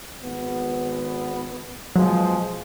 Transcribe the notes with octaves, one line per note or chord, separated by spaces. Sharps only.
G#1 B3
B2 F3 F#3 G#3